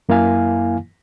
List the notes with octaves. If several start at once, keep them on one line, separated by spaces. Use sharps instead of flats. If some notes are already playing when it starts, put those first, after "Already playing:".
F#2 A#3 E4 F5 G#5